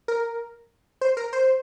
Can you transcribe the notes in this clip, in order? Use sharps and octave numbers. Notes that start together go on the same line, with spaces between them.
A#4
C5
A#4
C5